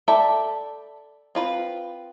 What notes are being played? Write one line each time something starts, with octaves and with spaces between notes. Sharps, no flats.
A4 D5 E5 G5 B5
C4 F4 B4